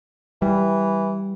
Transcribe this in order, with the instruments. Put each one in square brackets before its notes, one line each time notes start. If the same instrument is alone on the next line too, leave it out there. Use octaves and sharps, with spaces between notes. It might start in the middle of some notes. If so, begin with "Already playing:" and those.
[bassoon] E3 [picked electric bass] G3